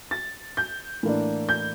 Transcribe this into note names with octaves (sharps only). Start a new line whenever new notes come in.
A6
G6
A2 E3 A#3 D4
G6